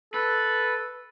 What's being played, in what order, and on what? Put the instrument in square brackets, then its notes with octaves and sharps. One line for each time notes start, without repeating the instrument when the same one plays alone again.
[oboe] A4 [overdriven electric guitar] B4